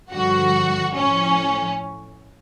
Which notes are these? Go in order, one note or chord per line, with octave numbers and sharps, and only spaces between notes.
G2 D3 F3 F#4
A2 F3 C#4